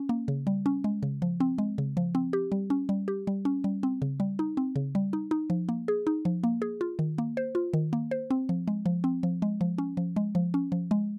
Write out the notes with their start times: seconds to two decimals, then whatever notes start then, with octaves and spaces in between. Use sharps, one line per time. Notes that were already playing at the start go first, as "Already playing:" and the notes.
Already playing: C#4
0.09 A#3
0.28 C#3
0.47 G3
0.66 C#4
0.84 G#3
1.03 C#3
1.22 F3
1.40 C4
1.58 G#3
1.78 C#3
1.97 F3
2.15 C4
2.33 G4
2.52 G3
2.70 C#4
2.89 G3
3.08 G4
3.27 G3
3.45 C#4
3.64 G3
3.83 C4
4.02 C#3
4.20 G3
4.39 D#4
4.57 C4
4.76 C#3
4.95 G3
5.13 D#4
5.31 D#4
5.50 F3
5.69 A#3
5.88 G#4
6.07 D#4
6.25 F3
6.43 A#3
6.62 G#4
6.81 F4
6.99 D#3
7.18 A#3
7.37 C5
7.55 F4
7.74 D#3
7.93 A#3
8.11 C5
8.30 C4
8.49 F3
8.68 G#3
8.86 F3
9.04 C4
9.23 F3
9.42 G#3
9.61 F3
9.78 C#4
9.97 F3
10.16 G#3
10.35 F3
10.54 C#4
10.72 F3
10.91 G#3